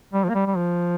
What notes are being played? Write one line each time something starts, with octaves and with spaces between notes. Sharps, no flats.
G3
F3
A#3
G3
G3
F3